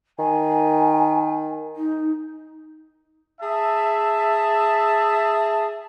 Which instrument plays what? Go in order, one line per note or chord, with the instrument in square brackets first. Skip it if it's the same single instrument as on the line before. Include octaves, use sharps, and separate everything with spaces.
[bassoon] D#3 [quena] G#5
[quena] D#4
[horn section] G#4 E5 A5